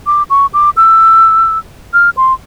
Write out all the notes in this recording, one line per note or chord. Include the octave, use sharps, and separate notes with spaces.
D6
C#6
D6
E6
F6
C6